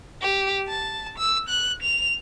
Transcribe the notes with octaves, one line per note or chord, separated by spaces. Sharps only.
G4
A5
E6
F#6
F7